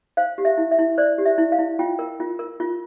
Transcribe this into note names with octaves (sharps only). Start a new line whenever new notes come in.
C5 F5
G4
E5
E4
E5
E4
C5 D5
G4
E5
E4
F5
E4
F4 G5
A#4
F4
A#4
F4